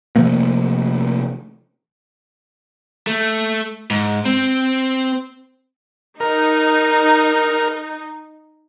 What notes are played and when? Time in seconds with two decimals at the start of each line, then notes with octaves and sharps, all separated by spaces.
0.16 C3 F3 A3 A#3
3.07 A3
3.91 G#2
4.25 C4
6.20 D#4 A#4